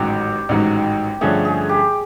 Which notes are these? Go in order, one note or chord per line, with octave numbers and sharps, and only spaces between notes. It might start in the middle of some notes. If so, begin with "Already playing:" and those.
Already playing: A1 G#2 D#3 F#3 G4
A1 G#2 D#3 F#3
G2 D3 F3 A3 C#4 G#4
G#4
G4